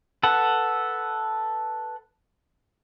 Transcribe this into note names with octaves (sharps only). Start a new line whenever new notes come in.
A4 B4 F#5